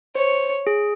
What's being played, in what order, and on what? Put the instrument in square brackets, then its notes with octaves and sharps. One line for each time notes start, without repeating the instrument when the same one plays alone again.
[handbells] C5 [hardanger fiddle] C#5
[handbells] G#4